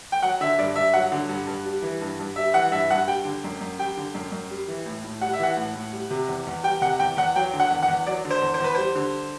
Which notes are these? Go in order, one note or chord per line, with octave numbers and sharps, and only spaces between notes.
G5
F#3 F#5
D3 E5
G2 D5
G2 E5
F#3 F#5
D3
G2
G2
G3
E3
G2
G2
G3 E5
E3 F#5
G2 E5
G2 F#5
G3 G5
D3
F#2
F#2
G3 G5
D3
F#2
F#2
G3
E3
A2
A2
G3 F#5
E5
E3 F#5
A2
A2
G3
C3
E2
E2
G3 G5
C3 F#5
E2 G5
E2 F#5
F#3 G5
D3
F#5
E2
F#5
E2
F#3 D5
D3
C5
E2
C5
E2 B4
G3 C5
D3